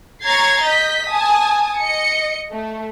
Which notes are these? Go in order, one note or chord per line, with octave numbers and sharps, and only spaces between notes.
C#5 A#5 G#6 A6 C7
D#5 G6 B6
G#5 A5 D#6
D#5 C#7
A3